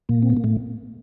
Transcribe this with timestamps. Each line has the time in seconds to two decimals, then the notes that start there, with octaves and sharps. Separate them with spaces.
0.09 A#2 A#3
0.23 C4
0.30 B3
0.37 A#3
0.44 A2 A3